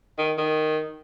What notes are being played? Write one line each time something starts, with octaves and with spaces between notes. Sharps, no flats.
D#3
D#3